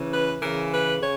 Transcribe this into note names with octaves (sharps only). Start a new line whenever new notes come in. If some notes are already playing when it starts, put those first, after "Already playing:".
Already playing: C#3 E3
B4
C#3 E3 A#4
B4
C#3 C#5